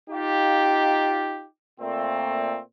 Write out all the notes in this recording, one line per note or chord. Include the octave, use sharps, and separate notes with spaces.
D#4 F4 G4
A#2 A3 C4